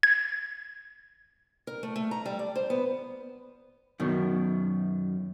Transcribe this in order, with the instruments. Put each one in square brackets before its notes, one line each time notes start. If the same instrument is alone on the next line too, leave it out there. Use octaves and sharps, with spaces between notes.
[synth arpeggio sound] G#6
[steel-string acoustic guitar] A#4
A3
A3
A#5
G3
D5
C5
B3
[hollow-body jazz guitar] F#2 B2 D#3